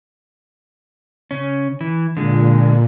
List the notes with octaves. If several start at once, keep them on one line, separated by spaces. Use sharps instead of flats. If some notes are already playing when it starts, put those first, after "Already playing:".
C#3 C#4
E3
A#2 D3 G#3